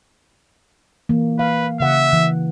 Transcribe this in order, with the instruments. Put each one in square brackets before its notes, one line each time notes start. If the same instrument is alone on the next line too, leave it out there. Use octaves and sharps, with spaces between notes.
[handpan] E3 A#3
[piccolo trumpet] B4 [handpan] F5
[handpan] C#3 F#5 [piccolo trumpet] E5
[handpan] E3